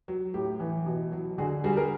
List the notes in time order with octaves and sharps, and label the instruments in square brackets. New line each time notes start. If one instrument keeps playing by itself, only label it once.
[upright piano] F#3
A2 G4
E3
B2
F#3
D3 F#4 G#4
G3 F#4 G#4
G#4 A#4